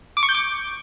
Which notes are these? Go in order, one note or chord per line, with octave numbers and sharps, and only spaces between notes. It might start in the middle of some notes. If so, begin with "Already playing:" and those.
D6
C#6
G6
D6